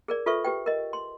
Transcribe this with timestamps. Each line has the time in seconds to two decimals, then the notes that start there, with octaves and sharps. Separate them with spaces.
0.08 G#4 A#4 D5
0.26 F4 A4 B4 E5 C#6
0.44 G4 B4 G5
0.66 A#4 D#5
0.93 C6